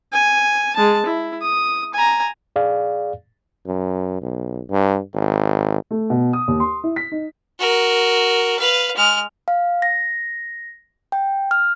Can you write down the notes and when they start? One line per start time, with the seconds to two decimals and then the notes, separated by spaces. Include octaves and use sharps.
0.13 G#5
0.76 G#3 A5
1.05 E4
1.42 D#6
1.94 G#5 A#5
2.56 G#4 D5 F5
3.66 F#2
4.22 B1
4.71 G2
5.14 G#1
5.91 A3
6.10 B2
6.33 D#6
6.48 D#2
6.60 C6
6.84 E4
6.96 B6
7.12 D#4
7.59 F#4 A#4
8.59 B4 F5
8.96 G#3 F6
9.48 F5
9.82 A#6
11.12 G5
11.51 F6